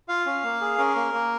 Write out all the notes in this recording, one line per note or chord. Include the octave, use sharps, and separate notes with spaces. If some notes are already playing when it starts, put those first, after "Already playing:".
F4 F5
C#4
A#3
G#4
C#4 A#4
A#3
A#3